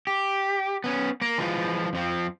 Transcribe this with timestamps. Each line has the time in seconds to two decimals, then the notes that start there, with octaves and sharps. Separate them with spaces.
0.07 G4
0.84 B3 C#4
1.21 A#3 A#4
1.38 E3 F3 G#3 F4
1.93 F2 F3 C4